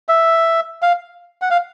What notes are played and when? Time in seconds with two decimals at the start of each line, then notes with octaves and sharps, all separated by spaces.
0.09 E5
0.82 F5
1.42 F#5
1.51 F5